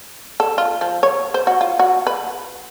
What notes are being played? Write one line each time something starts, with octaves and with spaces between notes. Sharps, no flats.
A4
F4
F3
C#5
C5
F#4
F4
F#4
B4